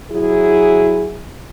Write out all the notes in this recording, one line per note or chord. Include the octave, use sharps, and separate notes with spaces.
F#3 E4 G#4